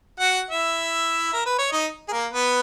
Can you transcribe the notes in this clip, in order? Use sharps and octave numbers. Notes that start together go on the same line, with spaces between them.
F#4 F#5
E4 E5
A#4
B4
C#5
D#4 D#5
G#4
A#3 A#4
B3 B4